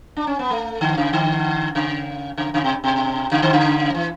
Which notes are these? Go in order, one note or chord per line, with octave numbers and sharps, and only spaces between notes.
D4
C#4
B3
A3
D3
C#3
D3
C#3
C#3
C#3
B2
B2
C#3
D3
C#3
E3